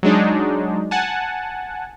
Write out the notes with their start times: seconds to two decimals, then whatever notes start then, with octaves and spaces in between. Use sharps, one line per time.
0.03 F#3 G#3 D4 D#4
0.91 F#5 G#5 A5